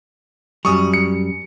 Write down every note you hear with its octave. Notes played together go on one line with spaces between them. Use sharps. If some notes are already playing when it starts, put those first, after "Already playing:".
F#2 G3 C#6 D#6
C#7